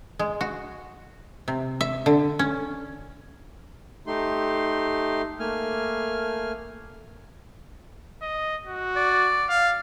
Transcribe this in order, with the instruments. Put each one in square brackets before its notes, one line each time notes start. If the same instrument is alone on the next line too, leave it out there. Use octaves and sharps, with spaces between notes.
[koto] G#3
F#4
C3
E5
D3
C#4
[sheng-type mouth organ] A3 D#4 G4 C6
A3 A#3 G#5 F6
[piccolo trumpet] D#5
F#4
[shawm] D5
[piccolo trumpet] F5